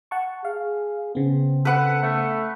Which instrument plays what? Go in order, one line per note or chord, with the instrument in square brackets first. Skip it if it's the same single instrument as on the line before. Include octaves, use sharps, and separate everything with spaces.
[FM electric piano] F#5 A5 C#6
[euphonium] G#4 [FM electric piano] F5
[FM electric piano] C#3 B3 [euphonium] C4
[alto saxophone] A4 [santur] B4 F#5
[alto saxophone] A3